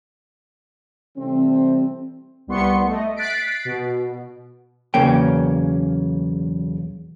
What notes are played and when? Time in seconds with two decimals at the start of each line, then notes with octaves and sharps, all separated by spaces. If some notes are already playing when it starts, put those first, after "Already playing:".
1.17 C3 E3 G3 A3 C4
2.47 C2 G3 B3 C6 C#6 C#7
2.86 A3 D#5
3.16 F#6 A6 B6 C7 D7
3.65 B2
4.94 B1 E2 C#3 A#3 C#4 G5